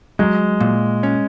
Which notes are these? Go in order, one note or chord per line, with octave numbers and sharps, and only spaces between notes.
F#3 G#3
A#2
C#4